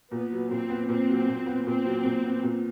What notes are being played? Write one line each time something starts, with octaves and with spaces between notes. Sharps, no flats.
A#2 B3
F#3
A#2 C4
B3
A#2 C4
F#3
A#2
B3
A#2 C4
F#3
A#2
B3
A#2